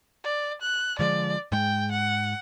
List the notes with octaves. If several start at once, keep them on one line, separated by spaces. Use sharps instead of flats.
D5
F#6
D3 F3 G#3 D5
G#2 G#3 G5
F#5